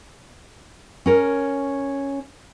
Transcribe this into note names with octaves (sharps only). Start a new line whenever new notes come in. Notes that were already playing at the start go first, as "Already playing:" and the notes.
C#4 A#4 C#5